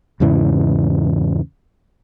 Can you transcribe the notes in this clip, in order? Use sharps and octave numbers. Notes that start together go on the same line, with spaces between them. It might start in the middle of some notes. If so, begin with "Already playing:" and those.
E2 G#2 C#3 E3